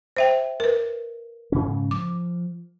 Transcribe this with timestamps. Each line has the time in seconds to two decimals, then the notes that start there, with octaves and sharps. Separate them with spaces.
0.17 C5 E5 G5
0.60 A#4 B4
1.52 G#2 C#3 C#4
1.91 F3 D6